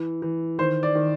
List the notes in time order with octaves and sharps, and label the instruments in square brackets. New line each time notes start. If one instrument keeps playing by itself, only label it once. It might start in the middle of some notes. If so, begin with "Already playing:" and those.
Already playing: [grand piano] E3
E3
D#3 C5
D5
D#3